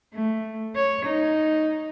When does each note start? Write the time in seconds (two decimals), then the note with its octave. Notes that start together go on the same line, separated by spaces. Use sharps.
0.14 A3
0.76 C#5
1.06 D#4